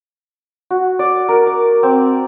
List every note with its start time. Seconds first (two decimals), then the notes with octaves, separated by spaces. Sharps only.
0.71 F#4
0.99 D5
1.29 A#4
1.47 D6
1.83 C4